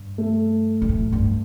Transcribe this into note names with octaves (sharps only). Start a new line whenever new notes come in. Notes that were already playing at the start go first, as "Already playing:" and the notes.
Already playing: G2
A3
G2
A2
G2